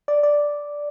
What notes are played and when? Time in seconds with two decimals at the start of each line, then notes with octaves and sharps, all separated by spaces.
0.08 D5
0.23 D5